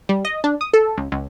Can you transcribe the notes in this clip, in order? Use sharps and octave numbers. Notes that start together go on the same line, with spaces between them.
G3
D#5
D4
D#6
A4
C#2
C#2